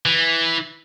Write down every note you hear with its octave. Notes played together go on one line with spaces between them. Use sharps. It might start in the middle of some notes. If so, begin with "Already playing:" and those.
E3